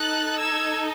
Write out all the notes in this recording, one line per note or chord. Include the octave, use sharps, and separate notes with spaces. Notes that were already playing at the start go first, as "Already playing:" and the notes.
Already playing: D#4 A4 F#6 A6
E6 G#6